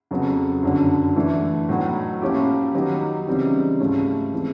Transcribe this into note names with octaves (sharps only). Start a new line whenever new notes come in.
F2 C#3 F#3 B3
F#2 D3 F#3
E3 A3 D4
A2 F#3 B3 D#4
F3 A#3 C#4 E4 G4
D#3 F#3 B3 D#4 G4
C#3 E3 G3 C4 D#4
G#2 F3 A3 C#4 E4
E3 G#3 C4